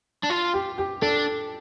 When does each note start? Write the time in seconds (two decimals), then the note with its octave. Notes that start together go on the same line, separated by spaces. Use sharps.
0.23 D4
0.30 F4
0.54 G4
0.78 G4
1.02 D4 A4